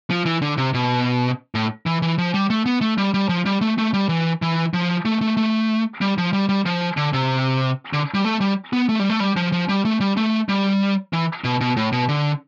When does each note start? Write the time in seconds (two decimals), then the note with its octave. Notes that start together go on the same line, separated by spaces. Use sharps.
0.11 F3
0.26 E3
0.42 D3
0.58 C3
0.74 B2
1.55 A2
1.86 E3
2.02 E3
2.18 F3
2.34 G3
2.50 A3
2.66 B3
2.81 A3
2.98 G3
3.14 G3
3.29 F3
3.46 G3
3.61 A3
3.78 A3
3.94 G3
4.09 E3
4.42 E3
4.74 F3
5.05 A3
5.21 A3
5.37 A3
6.01 G3
6.18 F3
6.33 G3
6.49 G3
6.66 F3
6.97 D3
7.13 C3
7.93 D3
8.14 G3
8.25 A3
8.41 G3
8.73 B3
8.89 A3
8.99 G3
9.10 A3
9.20 G3
9.37 F3
9.52 F3
9.69 G3
9.85 A3
10.00 G3
10.17 A3
10.49 G3
11.13 E3
11.44 B2
11.61 B2
11.77 A2
11.92 B2
12.09 D3